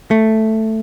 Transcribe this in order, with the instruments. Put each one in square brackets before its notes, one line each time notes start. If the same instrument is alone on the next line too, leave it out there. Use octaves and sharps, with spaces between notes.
[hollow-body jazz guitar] A3